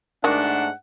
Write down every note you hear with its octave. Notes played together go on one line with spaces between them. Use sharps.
G#2 D#3 A3 D4 F#4 F#5